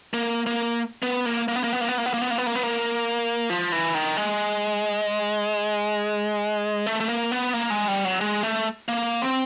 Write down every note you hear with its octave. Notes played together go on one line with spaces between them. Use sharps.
A#3
A#3
B3
A#3
A#3
B3
A#3
B3
A#3
B3
A#3
B3
A#3
B3
A#3
B3
A#3
B3
A#3
F3
E3
D#3
G#3
A3
A3
A#3
B3
A#3
G#3
G3
F#3
G#3
A3
A#3
C4